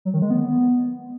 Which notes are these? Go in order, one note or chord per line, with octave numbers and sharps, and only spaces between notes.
F#3
D#3
G#3
B3